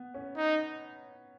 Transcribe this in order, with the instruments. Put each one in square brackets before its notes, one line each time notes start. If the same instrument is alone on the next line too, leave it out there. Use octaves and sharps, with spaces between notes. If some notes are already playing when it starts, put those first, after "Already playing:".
Already playing: [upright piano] B3
C#4
[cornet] D#4